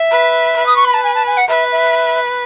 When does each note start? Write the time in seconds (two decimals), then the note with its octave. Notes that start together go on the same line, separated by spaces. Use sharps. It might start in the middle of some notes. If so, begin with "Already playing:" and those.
Already playing: E5
0.11 B4
0.57 B4
0.66 D#6
0.75 C#6
0.84 B5
0.93 A5
1.03 G#5
1.14 A5
1.26 G#5
1.37 F#5
1.48 B4 E5
1.71 E5